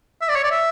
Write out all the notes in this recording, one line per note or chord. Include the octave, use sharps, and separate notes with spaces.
E5
D5
C#5
D5
E5